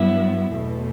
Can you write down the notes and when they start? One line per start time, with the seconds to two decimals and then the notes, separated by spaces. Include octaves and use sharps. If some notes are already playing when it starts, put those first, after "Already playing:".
Already playing: G2 F#3 B3 E4
0.54 E2 B2 A3